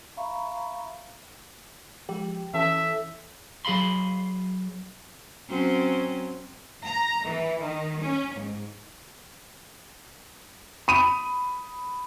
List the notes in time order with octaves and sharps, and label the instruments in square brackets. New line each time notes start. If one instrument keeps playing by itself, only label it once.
[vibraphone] E5 F5 A#5 B5 C#6
[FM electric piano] F3 G#3 G4
[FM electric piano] E3 C#4 A4 [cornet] E5
[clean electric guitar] F#3 G#4 F5 B5 C6
[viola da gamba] F#3 C4 C#4
[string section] A#5
E3
D#3
C#4
G#2
[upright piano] B5 D#6 D#7